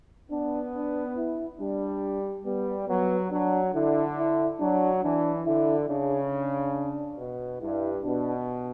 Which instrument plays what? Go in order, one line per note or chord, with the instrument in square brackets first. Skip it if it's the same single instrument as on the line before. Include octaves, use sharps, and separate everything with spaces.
[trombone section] B3 [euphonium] D4
[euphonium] D4
E4
[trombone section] G3 [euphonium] D4
[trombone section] G3 [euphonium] B3
[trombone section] F#3 [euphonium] B3
[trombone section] F#3 [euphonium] D4
[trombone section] D3 [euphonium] E4
[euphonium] E4
[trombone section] F#3 [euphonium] D4
[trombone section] E3 [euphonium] D4
[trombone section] D3 [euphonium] E4
[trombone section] C#3 [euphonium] D4
[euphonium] D4
[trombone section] B2
[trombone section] G2 [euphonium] E4
[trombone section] B2 [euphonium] D4